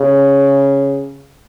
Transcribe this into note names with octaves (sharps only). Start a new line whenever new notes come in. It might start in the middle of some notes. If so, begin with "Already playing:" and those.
Already playing: C#3